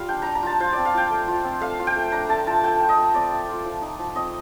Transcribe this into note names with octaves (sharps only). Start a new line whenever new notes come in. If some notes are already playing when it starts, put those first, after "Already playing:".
Already playing: G3 F4 F5
D4 G5
G3 A#5
A#5
F4 A5
F4 C5
C4 D5
F5
F3 G5
A3
F4
C4
A3 F5
F4
G5
A3
D4 A#5
A3 A5
F4 A5
A3 G5
F4
D#5
A3
C4 D5
A3
F4
F3
D#4
F3
C4 D#5